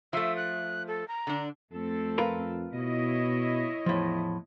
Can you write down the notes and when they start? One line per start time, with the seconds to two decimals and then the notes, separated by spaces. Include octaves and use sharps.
0.13 F3 A3 E5
0.37 F#6
0.88 A4
1.08 A#5
1.27 D3 D4
1.72 F2 A3 C4 A4
2.18 F4 A#4 B4
2.73 B2 E4 C#5 D#5
3.86 E2 A2 F3